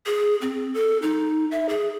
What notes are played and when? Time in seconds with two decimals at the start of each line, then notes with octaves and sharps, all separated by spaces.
0.06 G#4
0.42 C4
0.74 A4
1.02 D#4
1.51 E5
1.69 G#4